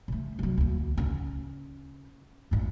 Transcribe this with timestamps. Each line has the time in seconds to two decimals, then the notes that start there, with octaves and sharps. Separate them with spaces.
0.08 C#3 A3
0.39 C2 F#3
0.57 D2 A#3
0.98 C#3 C#4
2.51 G#1 G#2